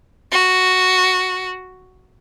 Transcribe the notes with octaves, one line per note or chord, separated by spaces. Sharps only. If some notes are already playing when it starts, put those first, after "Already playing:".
F#4